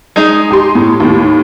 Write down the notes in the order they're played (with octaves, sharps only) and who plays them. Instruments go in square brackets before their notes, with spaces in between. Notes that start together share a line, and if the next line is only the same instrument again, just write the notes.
[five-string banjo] G#3 D#4
[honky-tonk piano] G4 C6
A2
D#2 A2